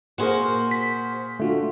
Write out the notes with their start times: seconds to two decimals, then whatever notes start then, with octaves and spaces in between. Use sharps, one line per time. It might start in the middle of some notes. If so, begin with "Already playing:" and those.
0.18 A#2 F#4 G#4 A#4 C5
0.71 B6
1.40 D3 A3 F4 F#4